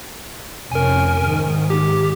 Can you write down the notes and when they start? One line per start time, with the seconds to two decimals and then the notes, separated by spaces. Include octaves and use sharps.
0.72 F1 C#4 A#4 G#5
1.21 G#2 D#3
1.70 G4